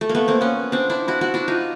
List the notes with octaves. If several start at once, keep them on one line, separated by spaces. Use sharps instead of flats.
A3
A#3
A3 B3
A#3 C4
B3 C#4
C4 D4
D4 E4
E4 F#4
E4 F#4
D4 E4
D#4 F4